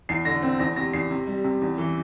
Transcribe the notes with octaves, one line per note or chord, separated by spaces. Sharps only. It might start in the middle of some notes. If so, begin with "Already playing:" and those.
E2 C7
D3 A#6
C4
E2 A#6
C3 A#6
E2 C7
C3
G3
C3
E2
E3